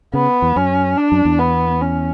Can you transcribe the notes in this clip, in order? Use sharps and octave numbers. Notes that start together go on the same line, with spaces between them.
C#3 B3
E2
F#2 C#4
D4
F#2
E2
B3
C#4